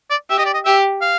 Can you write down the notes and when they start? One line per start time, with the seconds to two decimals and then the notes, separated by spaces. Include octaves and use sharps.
0.11 D5
0.30 G4 E5
0.38 D#5
0.46 D5
0.54 D#5
0.65 G4 E5
1.02 F5